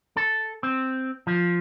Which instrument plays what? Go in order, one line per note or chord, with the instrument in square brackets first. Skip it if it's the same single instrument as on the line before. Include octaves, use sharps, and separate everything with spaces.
[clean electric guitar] A4
C4
F3